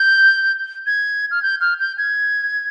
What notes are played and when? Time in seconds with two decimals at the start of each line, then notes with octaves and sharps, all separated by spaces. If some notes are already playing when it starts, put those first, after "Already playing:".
Already playing: G6
0.86 G#6
1.31 F6
1.43 G6
1.61 F6
1.80 G6
1.98 G#6